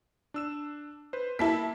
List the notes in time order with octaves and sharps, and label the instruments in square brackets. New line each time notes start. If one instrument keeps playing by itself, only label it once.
[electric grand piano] D4 E6 E7
B4 C5
[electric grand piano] A#3 [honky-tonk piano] E4 A5 B6